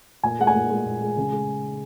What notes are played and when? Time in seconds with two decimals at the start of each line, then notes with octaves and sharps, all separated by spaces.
0.23 A#2 G#5
0.39 G#3 F#5
0.47 G#5
0.54 A#2
0.70 G#3
0.86 A#2
1.02 G#3
1.17 C#3
1.32 G#3